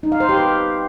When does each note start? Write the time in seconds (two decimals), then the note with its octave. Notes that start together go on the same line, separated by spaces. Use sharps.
0.03 D#4
0.12 F5
0.20 C5
0.29 G4
0.37 B4